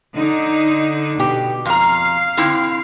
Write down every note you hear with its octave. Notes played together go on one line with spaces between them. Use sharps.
D3 D#4
B2 G4
F2 F5 A#5
D3 C4 E4